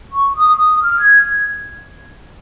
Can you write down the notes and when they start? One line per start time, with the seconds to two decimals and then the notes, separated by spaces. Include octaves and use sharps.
0.12 C#6
0.36 D#6
0.59 D#6
0.83 F6
1.00 G#6